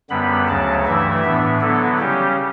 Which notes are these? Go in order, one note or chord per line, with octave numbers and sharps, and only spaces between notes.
F#2 D3 G3 B3 B5
D2 C#3 F#3 A5
G2 E3 A3 E4 E5
A2 E3 B3 D4
D3 F#3 B3 E4 A4
C#3 G3 C#4 G4